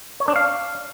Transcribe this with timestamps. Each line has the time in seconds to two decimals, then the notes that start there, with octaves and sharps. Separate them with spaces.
0.20 C#5
0.28 D4
0.36 F5